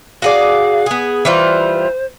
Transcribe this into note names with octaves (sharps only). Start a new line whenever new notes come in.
F#4 G#4 D5 F5
B3 G#4
E3 G3 F4 C5